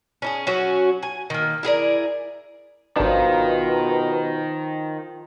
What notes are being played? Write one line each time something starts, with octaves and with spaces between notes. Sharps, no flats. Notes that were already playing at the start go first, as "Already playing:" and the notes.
C#4 D#4 G#4
F#3 C#4 F#4
G#5
D#3 A#3
E4 G#4 A#4 D5
G#1 B2 D#3 F3 D4 D#4